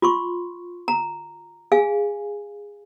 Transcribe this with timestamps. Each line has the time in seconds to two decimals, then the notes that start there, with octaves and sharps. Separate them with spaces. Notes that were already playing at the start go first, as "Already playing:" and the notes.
0.02 F4 C6 C#6
0.88 A#5
1.72 G#4 F5 G#5